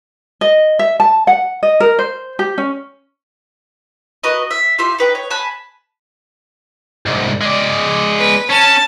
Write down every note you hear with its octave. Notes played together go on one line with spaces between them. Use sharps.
D#5
E5
A5
F#5
D#5
A#4
C5
G4
C#4
F#4 A#4 B4 D#5
E5
F4 G4 E5 C6
D#4 B4 G5
C#5
G#5 A5 B5 F#6
C2 G#2
G#3 D5
B4
C#4 A5